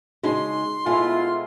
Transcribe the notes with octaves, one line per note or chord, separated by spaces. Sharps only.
C#3 G#3 D#4 F#4 C6
B2 G#3 A3 E4 F4 G#5